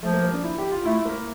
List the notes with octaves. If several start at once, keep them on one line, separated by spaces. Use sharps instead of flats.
F3 A3
A#3
A#3
D4
E4
G4
F4
A3 E4
A#3